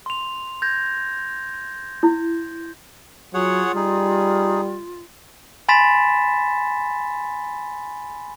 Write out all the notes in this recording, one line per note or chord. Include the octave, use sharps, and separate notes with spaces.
C6 F7
G6 G#6 A#6
E4
F#3 F4 G#4 C#5 F#5
G3 D#4 G#4
G#5 B5 C6 A6 B6 E7